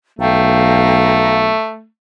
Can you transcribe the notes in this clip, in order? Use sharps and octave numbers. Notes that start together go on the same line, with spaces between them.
B1 A3 F5 G5 A#5